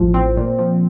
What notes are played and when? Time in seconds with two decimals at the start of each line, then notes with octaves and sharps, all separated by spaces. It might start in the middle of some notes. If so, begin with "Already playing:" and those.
Already playing: A1 A2 F3
0.14 C4
0.37 A#2
0.58 F3